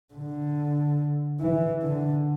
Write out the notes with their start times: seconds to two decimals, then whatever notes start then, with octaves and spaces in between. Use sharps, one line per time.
0.14 D3
1.40 E3
1.83 D3